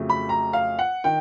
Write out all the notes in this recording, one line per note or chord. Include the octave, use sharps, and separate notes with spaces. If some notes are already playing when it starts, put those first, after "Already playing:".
Already playing: F2 C#3 F#3 A3
B5
A#5
F5
F#5
D#3 G5